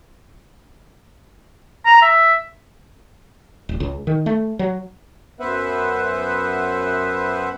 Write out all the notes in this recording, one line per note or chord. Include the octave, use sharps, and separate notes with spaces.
A#5
E5
D1
C#2
D#3
A3
F#3
F#2 B3 B4 C5 E5 F#5